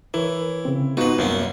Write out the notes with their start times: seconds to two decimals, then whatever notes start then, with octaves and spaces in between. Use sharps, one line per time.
0.14 E3 E4 A#4 C#5
0.65 C#3 C4
0.97 G#2 B3 D#4 F4 F#4 B4
1.18 C2 F#2 A#3 C#4